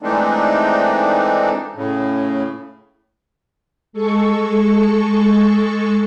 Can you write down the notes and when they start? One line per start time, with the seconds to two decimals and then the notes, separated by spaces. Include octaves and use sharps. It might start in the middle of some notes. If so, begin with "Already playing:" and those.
0.02 E3 G#3 A3 C4 D4 D#4
1.75 A2 C#3
3.93 G#3 A4 C#6